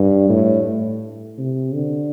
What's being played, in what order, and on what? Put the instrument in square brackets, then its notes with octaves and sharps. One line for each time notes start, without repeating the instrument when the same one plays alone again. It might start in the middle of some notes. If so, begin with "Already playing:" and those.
Already playing: [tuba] G2
A2
C3
D3